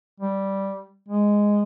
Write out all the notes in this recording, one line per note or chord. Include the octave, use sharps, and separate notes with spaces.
G3
G#3